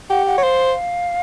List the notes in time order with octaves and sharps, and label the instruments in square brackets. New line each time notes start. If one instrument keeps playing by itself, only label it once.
[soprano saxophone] G4 [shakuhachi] F#5
[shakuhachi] F#5
[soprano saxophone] C#5
[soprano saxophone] C5 [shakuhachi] F5